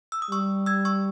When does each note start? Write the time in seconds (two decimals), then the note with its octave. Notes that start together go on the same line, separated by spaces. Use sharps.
0.12 E6
0.22 D#6
0.30 G3 C#6 E6
0.66 E6 G#6
0.85 C#6 E6